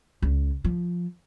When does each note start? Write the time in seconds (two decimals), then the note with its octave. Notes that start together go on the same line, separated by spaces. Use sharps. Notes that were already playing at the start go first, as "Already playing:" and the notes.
0.22 C#2
0.64 F3